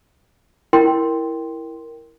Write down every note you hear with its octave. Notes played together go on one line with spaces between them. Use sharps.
E4 A#4 G5 C6